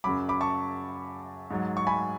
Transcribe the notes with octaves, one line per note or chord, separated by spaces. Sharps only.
F#2 C#3 F#3 B5 D6
B5 D6
A5 C#6
G#2 F#3
C#6
G#5 B5